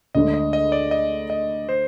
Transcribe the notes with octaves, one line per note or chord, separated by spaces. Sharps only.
D2 D3 G#3 D4 G#4 D#5
D#5
D#5
D5
D#5
D#5
C5